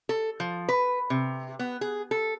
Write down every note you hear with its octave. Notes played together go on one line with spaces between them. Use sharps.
A4
F3
B4
C3
B3
G#4
A4